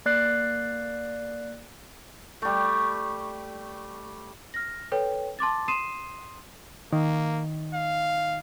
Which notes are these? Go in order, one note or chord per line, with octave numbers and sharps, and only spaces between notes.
A#3 D5 F#6 C7
G3 A3
F6 A#6
A4 B4 C#5 G5
A5 C6 D6 A6
C6 D#6 C7 D#7 E7
D#3 A#3
F5